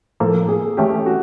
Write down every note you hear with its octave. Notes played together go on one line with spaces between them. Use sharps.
A2 F3 A#3 A4
G#4
E3 A3 C#4 G4
F#4